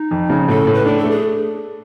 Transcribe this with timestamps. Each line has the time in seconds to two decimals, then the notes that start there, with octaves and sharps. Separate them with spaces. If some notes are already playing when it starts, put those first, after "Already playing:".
Already playing: D#4
0.11 F2
0.30 C#3
0.48 A2 A4
0.67 A2
0.74 B4
0.86 D4 A#4
0.98 A4
1.04 A3
1.10 G#4